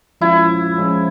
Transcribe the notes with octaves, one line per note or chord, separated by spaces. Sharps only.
F3 G#3 C#4 E4 F4
F3 G#3 C#4 F4